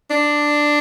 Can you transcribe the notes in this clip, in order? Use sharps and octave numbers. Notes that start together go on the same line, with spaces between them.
D4